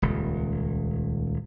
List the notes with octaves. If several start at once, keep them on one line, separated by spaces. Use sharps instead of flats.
D#1 C#2